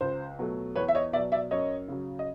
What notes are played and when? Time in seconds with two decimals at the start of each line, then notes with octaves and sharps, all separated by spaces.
0.01 C#2 C5
0.39 B2 F#3 A3
0.76 E2 B4 C#5
0.88 E5
0.95 C#5 D#5
1.13 B2 D5 E5
1.17 F#3
1.32 D5 E5
1.51 F#2 C#5 D#5
1.88 C#3 F#3
2.19 D#5